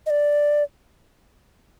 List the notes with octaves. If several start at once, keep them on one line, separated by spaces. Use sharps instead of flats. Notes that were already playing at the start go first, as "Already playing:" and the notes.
D#5
D5